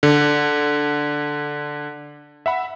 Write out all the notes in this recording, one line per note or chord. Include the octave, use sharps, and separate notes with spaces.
D3
E5 F#5 B5